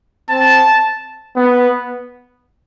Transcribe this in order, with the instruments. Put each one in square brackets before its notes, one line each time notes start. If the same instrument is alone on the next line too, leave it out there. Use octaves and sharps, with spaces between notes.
[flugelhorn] C4 [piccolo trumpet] A5
[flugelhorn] B3